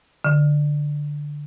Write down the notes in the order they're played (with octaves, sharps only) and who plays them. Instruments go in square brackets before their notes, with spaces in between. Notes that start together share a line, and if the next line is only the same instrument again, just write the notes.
[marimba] D3